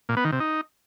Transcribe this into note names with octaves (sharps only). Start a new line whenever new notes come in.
A#2
B3
D#3
C3
D#4